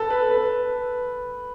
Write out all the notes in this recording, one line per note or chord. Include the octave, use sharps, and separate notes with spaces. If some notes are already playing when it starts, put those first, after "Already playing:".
Already playing: A4 B4
B4
B4